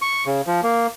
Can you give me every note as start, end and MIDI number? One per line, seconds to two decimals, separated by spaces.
0.02 0.24 85
0.26 0.42 49
0.47 0.61 53
0.63 0.87 58